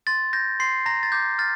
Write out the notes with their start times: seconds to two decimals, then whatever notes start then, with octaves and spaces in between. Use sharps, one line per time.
0.07 C6 A6
0.33 G6 A#6
0.60 C6 C7
0.86 A#5 A#6
1.03 A6
1.12 D6 G6
1.39 F6 A6